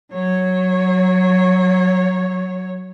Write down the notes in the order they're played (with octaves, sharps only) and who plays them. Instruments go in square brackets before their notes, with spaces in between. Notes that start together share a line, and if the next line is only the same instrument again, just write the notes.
[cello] F#3 C#5